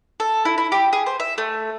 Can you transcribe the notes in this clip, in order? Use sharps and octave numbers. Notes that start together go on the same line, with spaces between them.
A4
E4
E4
G4
G#4
C5
E5
A3